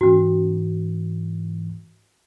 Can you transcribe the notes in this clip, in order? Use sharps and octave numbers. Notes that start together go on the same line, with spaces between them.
G#2 E3 C#4 F#4